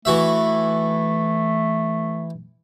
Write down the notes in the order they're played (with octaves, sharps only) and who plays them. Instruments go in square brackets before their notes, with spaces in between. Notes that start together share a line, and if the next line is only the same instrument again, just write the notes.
[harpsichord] E3 F#4 E5 [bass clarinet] A3